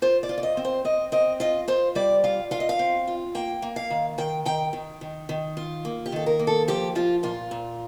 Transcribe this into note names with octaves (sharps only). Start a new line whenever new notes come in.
F4 C5
D5
F4
D5
D#5
C4
C5
C4 D#5
C4 D#5
F4 D#5
F4 C5
G3 D5
F4 F5
F4 F5
D#5
F5
C4
F4
A#3 G5
A#3
F5
D#3
D#3 G5
D#3 G5
D#3
D#3
D#3
F4
A#3
G4
D#3 A4
A#4
A#3
A4
F3 G4
F3 F4
A#2 F4
A#2